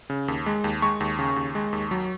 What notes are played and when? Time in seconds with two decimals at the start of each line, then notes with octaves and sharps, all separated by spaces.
0.10 C#3
0.28 D#2
0.46 G#3
0.64 D#2
0.82 G#3 C#6
1.00 D#2
1.19 C#3
1.36 D#2
1.55 G#3
1.73 D#2
1.91 F#3